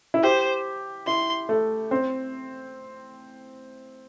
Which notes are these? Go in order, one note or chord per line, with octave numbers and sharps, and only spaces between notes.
E4
G4 C5
E4 C6
A3
C4